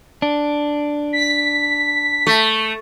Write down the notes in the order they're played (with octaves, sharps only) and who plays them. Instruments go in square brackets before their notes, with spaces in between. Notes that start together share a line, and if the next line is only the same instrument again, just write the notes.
[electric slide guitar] D4
[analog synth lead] B6
[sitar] A3